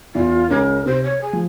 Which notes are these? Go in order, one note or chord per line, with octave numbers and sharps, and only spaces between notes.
E2 E3 F4
C#2 C#3 A#4
C3 C5
C#5
G#4
F3